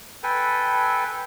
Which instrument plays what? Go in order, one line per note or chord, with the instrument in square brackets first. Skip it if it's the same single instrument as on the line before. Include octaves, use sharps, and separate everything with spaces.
[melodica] A4 B4 G5 G#5